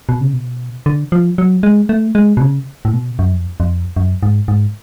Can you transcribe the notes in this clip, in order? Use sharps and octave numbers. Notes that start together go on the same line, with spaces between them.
B2
C#3
B2
D3
F3
F#3
G#3
A3
G#3
B2
C#3
A2
B2
F#2
F2
F2
F#2
G#2
G#2